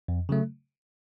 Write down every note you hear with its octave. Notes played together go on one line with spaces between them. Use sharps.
F2
C#3 F#3 A3